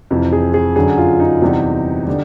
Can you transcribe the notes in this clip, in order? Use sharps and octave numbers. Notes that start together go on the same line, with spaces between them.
F2 C3 E3
G#4
G#4
F#2 D3 F#3 G#4
F4
D#4
E2 C3 E3 G3
D3 G3